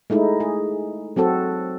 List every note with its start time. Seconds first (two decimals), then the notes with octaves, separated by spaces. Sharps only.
0.10 G#3 A3 D#4 E4
0.40 G#4
1.16 F#3 C4 F#4 A4